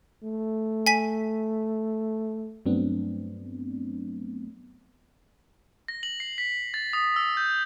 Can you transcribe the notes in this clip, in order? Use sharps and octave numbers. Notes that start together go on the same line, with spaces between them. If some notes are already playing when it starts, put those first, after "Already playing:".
A3
G#5 B6
G2 F#3 A3 B3 C4 D4
A#6
F#7
C7
B6
A6
D#6
E6
G6